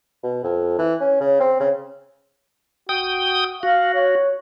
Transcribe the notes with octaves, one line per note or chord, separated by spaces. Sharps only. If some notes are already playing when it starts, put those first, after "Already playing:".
B2
F2
E3
C#4
C#3
C4
C#3
F#4 G5 D#6
F#4 F5
C#5